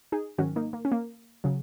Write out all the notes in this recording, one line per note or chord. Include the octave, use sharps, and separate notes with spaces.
D#4 G#4
G#2 D#3 F#3 C#4 F#4
A#3 D#4
A#3
C#4
A#3
C#3 F#3